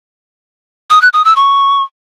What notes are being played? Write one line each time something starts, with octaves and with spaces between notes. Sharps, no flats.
D#6
F#6
D#6
E6
C#6